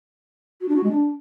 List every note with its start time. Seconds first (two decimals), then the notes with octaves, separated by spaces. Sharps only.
0.61 F#4
0.68 D4
0.76 F#4
0.84 G#3
0.91 D4